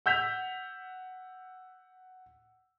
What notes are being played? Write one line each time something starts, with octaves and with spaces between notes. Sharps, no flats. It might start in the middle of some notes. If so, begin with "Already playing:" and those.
F#5 E6 G6 B6 F7